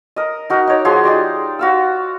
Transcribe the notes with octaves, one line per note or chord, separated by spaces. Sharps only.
A#4 D#5
D#4 F#4 A#4
D#4 C#5 D6
F3 F#4 G#4 C6
D#4 G4 D5 C6
F#4 F5 E6